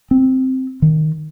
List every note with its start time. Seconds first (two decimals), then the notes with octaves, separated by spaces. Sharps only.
0.11 C4
0.82 D#3